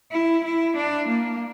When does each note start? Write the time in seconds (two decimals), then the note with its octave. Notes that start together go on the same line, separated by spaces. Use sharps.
0.12 E4
0.44 E4
0.77 D4
1.08 A#3